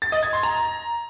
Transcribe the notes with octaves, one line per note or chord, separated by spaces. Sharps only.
A6
D#5
G#6
C6
A#5